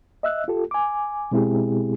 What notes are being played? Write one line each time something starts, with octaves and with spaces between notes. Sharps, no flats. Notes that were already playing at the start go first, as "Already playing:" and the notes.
D#5 E5 E6 F#6
F4 G4 A4
G#5 D6
B2 G#3 C4 E4 G4 G#4